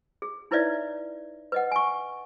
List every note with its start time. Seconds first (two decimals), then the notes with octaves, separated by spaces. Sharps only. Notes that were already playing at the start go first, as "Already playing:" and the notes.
0.22 G#4
0.51 D#4 E4 B4 C#5 D5 E5
1.52 B4 D#5 F#5
1.72 G#5 C#6